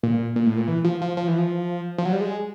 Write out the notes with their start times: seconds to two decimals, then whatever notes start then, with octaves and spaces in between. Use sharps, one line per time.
0.03 A#2
0.36 A#2
0.46 A2
0.57 A#2
0.68 E3
0.84 F3
1.01 F3
1.17 F3
1.28 E3
1.38 F3
1.98 F3
2.05 F#3
2.13 G3
2.21 G#3